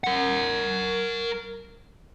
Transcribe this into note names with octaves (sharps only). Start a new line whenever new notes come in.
A#4 F#5